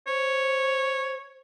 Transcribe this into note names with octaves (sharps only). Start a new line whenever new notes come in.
C5 C#5